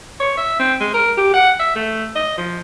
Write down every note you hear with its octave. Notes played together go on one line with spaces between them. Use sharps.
C#5
E5
C4
G#3
A#4
G4
F#5
E5
A3
D#5
F3